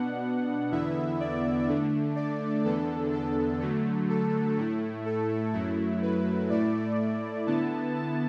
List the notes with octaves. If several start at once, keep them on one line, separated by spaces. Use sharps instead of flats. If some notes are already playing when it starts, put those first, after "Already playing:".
Already playing: B2 B3 D4 F#5
E2 D3 B3 E4 E5
D5
D3 A3 D4
D5
E2 D3 B3 D4 A4
A4
D3 F#3 A3
A4
A2 A3 E4
A4
F#2 F#3 A3 E4
B4
A2 A3 E4 D5
D3 B3 E4 A5
A5